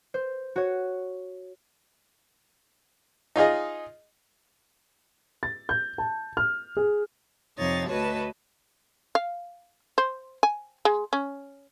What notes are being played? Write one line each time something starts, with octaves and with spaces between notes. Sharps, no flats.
C5
F#4 C#5
D#4 F4 G#4 D#5
A6
G6
A5
F6
G#4
F2 C3 F3 D#4 C#5 A6
D2 F#4 B4 C#5 D#5 A5
F5
C5
G#5
G#3
C#4